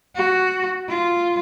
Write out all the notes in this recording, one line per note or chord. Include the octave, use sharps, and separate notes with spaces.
F#4
F4